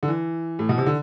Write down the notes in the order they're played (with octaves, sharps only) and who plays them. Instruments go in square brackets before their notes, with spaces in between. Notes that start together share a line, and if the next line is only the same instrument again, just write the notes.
[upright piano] D3
E3
A2
B2
C3
D3